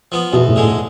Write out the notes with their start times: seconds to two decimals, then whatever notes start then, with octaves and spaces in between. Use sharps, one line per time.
0.12 F3 B3
0.33 E2 B2
0.48 A2
0.56 D3 G#3
0.63 A2